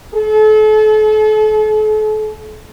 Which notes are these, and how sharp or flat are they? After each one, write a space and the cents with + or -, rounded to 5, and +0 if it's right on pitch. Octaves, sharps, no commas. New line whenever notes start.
A4 -40